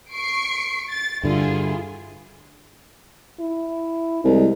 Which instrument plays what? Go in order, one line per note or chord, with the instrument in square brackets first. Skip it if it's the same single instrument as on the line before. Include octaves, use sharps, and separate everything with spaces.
[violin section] C#6 C7 D7
A6
[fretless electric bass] G2 D3 [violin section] E4 F4 G#4
[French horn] E4
[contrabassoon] C2 [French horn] G#3